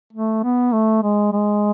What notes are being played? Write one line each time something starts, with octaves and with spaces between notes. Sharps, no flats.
A3
B3
A3
G#3
G#3